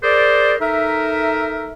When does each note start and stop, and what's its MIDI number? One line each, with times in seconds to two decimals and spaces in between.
0.03 0.55 68
0.03 0.55 70
0.03 0.55 72
0.03 0.55 74
0.61 1.73 63
0.61 1.73 69
0.61 1.73 70
0.61 1.73 76